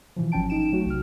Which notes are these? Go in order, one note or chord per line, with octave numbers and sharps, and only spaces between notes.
B2 E3 F3
G#1 F#3 C#4 G5 A5 D7
D#4 D7 E7
F#3 A3 F#4
B1 C3 F6